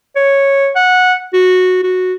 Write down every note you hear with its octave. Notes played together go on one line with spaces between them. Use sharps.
C#5
F#5
F#4
F#4